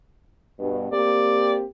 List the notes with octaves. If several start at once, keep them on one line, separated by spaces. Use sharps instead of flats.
G2 B2
A#3 C4 G4 D5